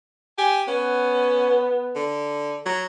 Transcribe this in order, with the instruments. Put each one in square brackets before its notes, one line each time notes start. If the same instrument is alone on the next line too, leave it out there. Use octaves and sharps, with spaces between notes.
[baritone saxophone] G4 [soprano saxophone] G#5
[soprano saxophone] B3 [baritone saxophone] C#4
[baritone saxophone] D3
[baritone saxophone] F#3 [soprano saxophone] A#5